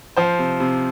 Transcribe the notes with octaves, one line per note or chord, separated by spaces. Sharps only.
F3 C5
C3
C3